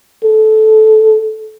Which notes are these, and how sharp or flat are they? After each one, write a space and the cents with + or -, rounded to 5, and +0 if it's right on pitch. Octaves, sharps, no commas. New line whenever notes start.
A4 -15